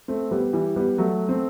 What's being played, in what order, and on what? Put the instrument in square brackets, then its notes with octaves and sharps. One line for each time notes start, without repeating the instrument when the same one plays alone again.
[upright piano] A3 C4
G3 B3
E3 G3
G3 B3
F#3 A3
A3 C4